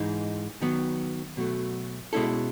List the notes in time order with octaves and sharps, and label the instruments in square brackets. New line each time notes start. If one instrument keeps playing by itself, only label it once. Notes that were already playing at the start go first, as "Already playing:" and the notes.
Already playing: [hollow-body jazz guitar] G#2 E3 G#3 D#4
D#3 F#3 B3
B2 F#3 A3
B2 G#3 C#4 E4 A4